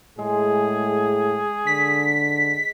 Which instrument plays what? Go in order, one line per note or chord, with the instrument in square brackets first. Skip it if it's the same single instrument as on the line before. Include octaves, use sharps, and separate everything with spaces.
[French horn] A2 [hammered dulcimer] G#3 [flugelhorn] G#4
[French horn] D3 [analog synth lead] B6